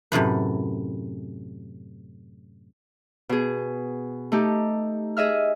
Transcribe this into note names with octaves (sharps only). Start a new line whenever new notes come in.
F#2 A2 C3 B4
B2 G#4
A3 D#4 G4
G#4 D#5 E5 F6